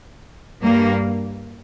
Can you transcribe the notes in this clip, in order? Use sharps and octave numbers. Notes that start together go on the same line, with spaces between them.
G2 G3 A#3